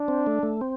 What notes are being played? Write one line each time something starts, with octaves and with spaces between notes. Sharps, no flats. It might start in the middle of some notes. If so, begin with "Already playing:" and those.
Already playing: D4
C4
A3
A3
C4